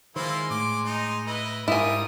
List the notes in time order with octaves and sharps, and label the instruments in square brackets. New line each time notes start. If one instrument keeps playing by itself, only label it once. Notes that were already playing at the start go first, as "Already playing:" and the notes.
[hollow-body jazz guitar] D#3 C5 [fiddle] G#3 C6 [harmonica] A#3 E4 F4
[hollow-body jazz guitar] A2 [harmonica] D6
[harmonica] D#4
[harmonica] E4 B4 [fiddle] D#5
[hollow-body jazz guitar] G#2 [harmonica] G3 D#6 [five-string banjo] E4 G#5 [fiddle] F4 A#4